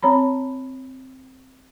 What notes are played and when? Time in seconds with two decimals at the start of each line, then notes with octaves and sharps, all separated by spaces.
0.03 C4 C#5 A#5 B5